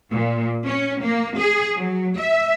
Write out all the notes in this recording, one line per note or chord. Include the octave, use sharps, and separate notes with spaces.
A#2
C#4
A#3
G#4
F#3
E5